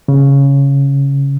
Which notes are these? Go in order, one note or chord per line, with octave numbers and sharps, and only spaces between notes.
C#3